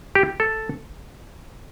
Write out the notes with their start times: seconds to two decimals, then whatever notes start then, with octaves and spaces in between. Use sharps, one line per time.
0.15 G4
0.40 A4